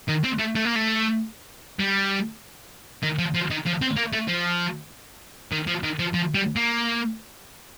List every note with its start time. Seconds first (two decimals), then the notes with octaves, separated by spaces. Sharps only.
0.09 D#3
0.24 C4
0.39 A3
0.55 A3
0.65 A#3
0.76 A3
1.79 G3
3.03 D#3
3.19 F3
3.34 F3
3.50 D#3
3.66 F3
3.81 C4
3.97 A#3
4.13 A3
4.28 F3
5.52 D#3
5.67 F3
5.83 D#3
5.99 F3
6.14 F3
6.35 G3
6.56 A#3